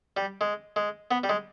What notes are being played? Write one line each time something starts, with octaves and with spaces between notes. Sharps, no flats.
G3
G#3
G#3
B3
G3
G#3